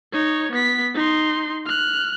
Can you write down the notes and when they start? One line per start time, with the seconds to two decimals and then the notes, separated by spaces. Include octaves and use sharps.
0.13 D#4 C#5
0.52 B3 B6
0.94 D#4 C6
1.66 F6 F#6